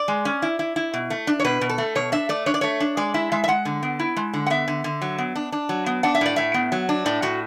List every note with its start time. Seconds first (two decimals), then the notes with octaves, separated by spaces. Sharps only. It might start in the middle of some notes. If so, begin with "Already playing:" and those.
Already playing: D5
0.08 G#3
0.25 C#4
0.42 E4
0.59 E4
0.76 E4
0.94 B2
1.10 A3
1.27 D4
1.40 C#5
1.44 B2 B4
1.61 B2
1.70 A4
1.78 A3
1.95 B2 C#5
2.12 D4 E5
2.29 A3 D5
2.46 D4 C#5
2.54 D5
2.61 A3 C#5
2.80 D4
2.97 G#3 D5
3.14 E4 E5
3.32 G#3 E5
3.44 E5
3.48 G#3 F#5
3.65 D3
3.83 B3
4.00 E4
4.17 G#3
4.33 D3
4.47 F#5
4.50 B3 E5
4.68 D3
4.84 D3
5.02 F#3
5.18 B3
5.36 D4
5.52 D4
5.69 F#3
5.86 B3
6.03 D4 F#5
6.15 E5
6.21 A2 D5
6.36 A2 E5
6.54 B3
6.72 F#3
6.89 D4
7.06 A2 D5
7.22 A2 F#4